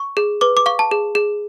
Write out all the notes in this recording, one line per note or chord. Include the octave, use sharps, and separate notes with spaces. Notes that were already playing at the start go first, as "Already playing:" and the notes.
Already playing: C#6
G#4
B4 D6
D6
F5 C#6
A5
G#4
G#4